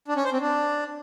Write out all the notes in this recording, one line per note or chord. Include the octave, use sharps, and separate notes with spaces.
D4
C#4
C5
C4
D4